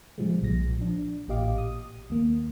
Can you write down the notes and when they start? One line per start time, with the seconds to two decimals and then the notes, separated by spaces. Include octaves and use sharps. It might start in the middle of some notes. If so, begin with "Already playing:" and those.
0.18 A#2 C#3 F3 G3 G#3
0.42 B1 A#2 F3 A#6
0.78 F3 D4
1.28 A1 A#2 G4 D#5 F5 D6
1.58 D#6
2.10 D#2 A#3